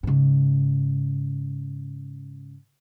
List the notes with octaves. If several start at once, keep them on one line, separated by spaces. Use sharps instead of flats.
G#2 C#3